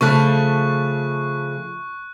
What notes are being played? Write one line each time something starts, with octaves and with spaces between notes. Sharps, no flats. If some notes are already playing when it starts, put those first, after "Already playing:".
C#3 F3 A3 C#6 F#6